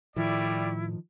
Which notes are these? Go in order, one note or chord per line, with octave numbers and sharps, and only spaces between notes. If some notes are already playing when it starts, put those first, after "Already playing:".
A2 D#3 F3 G3 A3 E4 D5